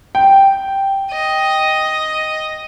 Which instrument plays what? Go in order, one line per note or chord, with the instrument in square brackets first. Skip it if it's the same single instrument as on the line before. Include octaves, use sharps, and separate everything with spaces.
[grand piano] G5
[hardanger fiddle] D#5